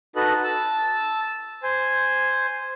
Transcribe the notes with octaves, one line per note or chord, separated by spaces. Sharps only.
D#4 F#4 A4 B4 D#5 F#6
A5 E6
C5 G#5